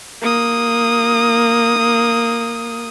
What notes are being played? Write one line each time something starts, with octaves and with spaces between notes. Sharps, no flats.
A#3 D#6